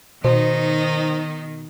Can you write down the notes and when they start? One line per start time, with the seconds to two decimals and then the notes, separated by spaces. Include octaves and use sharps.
0.24 B2 D#3 D#4 C5